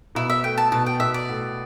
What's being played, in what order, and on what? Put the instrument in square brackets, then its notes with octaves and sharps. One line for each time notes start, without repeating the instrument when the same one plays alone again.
[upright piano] B2 [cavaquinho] E4
[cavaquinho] E5
[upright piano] A3 [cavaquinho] G5
[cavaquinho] A5
[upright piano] B2 [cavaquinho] A5
[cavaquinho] G5
[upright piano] B2 [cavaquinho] E5
[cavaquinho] D5
[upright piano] A2